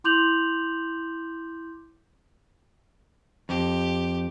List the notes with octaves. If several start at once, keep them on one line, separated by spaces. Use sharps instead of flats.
E4 C6 D6 G6 F7 F#7
F2 G4